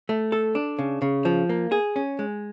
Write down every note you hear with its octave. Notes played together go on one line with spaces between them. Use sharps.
A3
A4
D4
C#3
C#3
F3
A#3
G#4
C#4
G#3